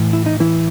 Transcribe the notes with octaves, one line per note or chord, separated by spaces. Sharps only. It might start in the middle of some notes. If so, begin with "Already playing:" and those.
Already playing: A2 E3
E4
D#4
E3 E4